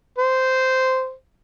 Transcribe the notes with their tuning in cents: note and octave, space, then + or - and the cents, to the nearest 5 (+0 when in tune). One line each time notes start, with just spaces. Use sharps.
C5 -10